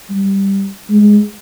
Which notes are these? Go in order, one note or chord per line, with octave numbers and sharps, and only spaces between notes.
G3
G#3